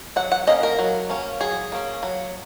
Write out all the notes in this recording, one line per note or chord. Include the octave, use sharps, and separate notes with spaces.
F#3 F#5
F#5
A#3 C#4 D#5
A#4
F#3
A#3 C#4
F#3 G#4
A#3 C#4
F#3